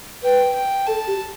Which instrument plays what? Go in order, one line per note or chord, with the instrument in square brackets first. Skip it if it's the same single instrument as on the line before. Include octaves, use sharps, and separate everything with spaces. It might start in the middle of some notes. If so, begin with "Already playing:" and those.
[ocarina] B4 [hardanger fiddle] G5
[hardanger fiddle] G5
[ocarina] A4 [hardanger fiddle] A5
[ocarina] G4